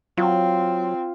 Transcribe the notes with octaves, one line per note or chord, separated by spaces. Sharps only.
F#3 C4 F4